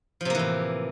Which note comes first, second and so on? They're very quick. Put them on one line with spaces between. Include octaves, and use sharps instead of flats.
F3 C3 A#3 E3 A2